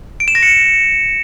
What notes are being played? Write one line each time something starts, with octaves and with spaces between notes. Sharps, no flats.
D7
E7
A#6
C#7